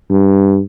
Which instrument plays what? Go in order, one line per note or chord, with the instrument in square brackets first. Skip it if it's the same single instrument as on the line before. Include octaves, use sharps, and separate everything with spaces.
[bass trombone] G2